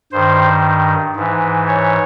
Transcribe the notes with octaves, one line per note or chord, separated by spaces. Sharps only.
G2 D#3 C5
G#2 E3
C#5